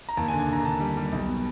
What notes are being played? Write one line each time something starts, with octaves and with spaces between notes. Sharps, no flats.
A#5
D#2 A5
G#5
D3
G#5
D3 A#5
D3 A5
G3
G3
B1
B2